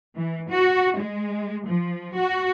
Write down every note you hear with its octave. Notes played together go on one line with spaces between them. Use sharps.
E3
F#4
G#3
F3
F#4